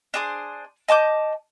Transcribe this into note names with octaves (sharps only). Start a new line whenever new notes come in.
D4 G#4 C5
D#5 A5 D6 G6